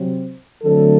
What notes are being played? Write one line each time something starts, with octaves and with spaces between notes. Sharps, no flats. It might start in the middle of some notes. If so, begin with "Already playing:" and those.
Already playing: C3 F#3 C4
D3 F#3 A3 C4 A4